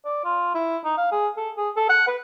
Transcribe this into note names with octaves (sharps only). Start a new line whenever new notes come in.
D5
F4
E4
D#4
F5
G#4
A4
G#4
A4
F#5
B4